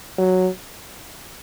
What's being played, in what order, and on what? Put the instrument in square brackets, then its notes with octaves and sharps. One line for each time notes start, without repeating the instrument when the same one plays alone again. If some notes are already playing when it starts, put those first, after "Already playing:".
[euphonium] F#3